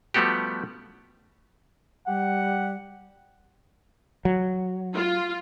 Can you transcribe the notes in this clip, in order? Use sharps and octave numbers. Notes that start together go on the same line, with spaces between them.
F3 G3 A3 B3 F#4 G4
G3 G4 F#5
F#3
F4